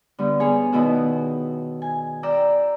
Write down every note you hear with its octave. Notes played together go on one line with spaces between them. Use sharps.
D3 G3 B3
B3 G#4 C#5 G#5
B2 D#3 B3 E4 F#4
G#5
D5 G5 A#5 E6